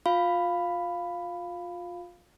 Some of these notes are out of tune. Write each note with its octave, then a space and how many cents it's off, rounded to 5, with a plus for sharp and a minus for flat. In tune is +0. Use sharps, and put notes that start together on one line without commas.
F4 +25 F5 +0 B5 +10